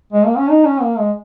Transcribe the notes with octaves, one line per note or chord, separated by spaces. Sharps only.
G#3
A#3
C#4
D#4
C#4
A#3
G#3